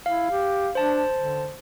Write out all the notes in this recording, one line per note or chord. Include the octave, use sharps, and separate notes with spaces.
E4 F5
G4
D4 C5 A5
D3